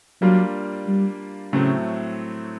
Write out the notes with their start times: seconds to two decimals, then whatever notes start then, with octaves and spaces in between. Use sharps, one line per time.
0.22 F#3 G3 A#3 D4 F4
0.87 G3
1.53 A2 C#3 F#3 A3 C4